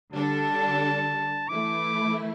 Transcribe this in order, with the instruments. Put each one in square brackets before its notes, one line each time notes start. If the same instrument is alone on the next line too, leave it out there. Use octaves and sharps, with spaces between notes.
[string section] D3 G3 D4 A4 [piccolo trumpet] A5
[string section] E3 A3 E4 [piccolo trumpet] D6